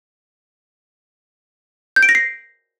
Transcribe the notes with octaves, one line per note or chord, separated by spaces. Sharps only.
G6
D7
A#6
C7